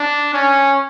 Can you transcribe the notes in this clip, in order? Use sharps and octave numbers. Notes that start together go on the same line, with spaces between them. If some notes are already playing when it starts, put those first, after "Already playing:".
Already playing: D4
C#4